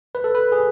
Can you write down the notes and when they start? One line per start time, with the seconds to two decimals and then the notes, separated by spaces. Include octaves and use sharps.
0.15 B4
0.24 A4
0.35 B4
0.52 G#4